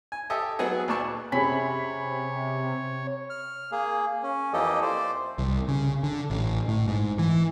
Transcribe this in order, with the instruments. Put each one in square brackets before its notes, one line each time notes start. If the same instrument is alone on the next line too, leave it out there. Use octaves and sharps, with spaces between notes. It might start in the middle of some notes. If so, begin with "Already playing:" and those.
[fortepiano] G#5
G4 A4 D#5 E5
F#3 B3 F#4 G#4 D#5
D2 A#2 D5 A5 C#6
[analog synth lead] C3 [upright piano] C#4 G#4 G#5 [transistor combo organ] C#5 [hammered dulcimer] B5
[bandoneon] F6
A#3 G#4
C#4
F2 E3 A#3 G4 A4 D#5
C5 D5
[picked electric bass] C2
C#3
D3
A1
A2
G#2
E3